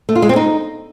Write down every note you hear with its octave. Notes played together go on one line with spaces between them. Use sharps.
A3
F4
G#3
C4
D#4